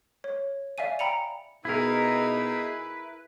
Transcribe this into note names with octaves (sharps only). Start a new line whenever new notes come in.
C#5
D5 E5 F5 G#5 D#7
G5 A#5 B5 C#7 F7
B2 D#4 E4 G#4 A#4 B4 E5